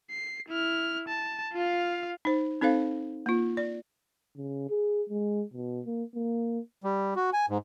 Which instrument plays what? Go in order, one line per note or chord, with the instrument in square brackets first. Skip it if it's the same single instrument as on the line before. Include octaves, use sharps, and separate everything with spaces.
[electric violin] C7
E4 F6
A5
F4 F5
[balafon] D#4 C5
C4 D#4 A4 C5 F5
A#3 F4
D5
[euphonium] C#3
G#4
G#3
B2
A#3
A#3
[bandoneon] G3
F#4
G#5
G#2